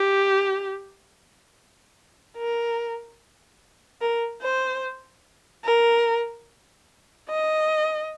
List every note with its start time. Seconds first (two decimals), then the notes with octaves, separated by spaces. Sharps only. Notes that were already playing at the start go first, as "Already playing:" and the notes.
Already playing: G4
2.37 A#4
4.01 A#4
4.42 C5
5.65 A#4
7.29 D#5